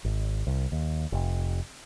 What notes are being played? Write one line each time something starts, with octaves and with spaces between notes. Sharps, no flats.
G#1
C2
D#2
F1